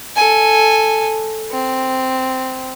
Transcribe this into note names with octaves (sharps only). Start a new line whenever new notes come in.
A4 G#5
C4